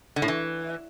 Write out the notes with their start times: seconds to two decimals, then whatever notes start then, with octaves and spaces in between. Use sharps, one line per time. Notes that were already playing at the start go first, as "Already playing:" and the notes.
0.16 D3
0.22 A2
0.28 E3